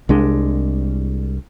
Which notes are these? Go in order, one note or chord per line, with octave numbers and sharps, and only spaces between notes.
C2 G#3 D4